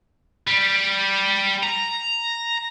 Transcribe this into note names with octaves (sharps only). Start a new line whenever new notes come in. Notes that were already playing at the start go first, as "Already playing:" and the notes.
G3
A#5